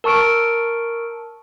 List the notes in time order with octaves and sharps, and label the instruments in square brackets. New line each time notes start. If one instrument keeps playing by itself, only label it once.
[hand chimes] A#4 A5 C#6 F6 D7